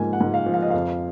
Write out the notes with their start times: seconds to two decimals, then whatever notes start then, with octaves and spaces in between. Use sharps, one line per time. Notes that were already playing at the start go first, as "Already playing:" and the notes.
Already playing: G#2 F3 A#3 G#5
0.13 F#5
0.21 G#2
0.34 F5
0.46 F3
0.54 F5
0.62 D#5
0.70 F2 F5